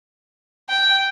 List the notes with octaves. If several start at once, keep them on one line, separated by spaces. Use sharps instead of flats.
G5